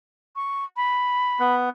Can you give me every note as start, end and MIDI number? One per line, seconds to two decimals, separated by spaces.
0.36 0.65 85
0.77 1.55 83
1.39 1.69 59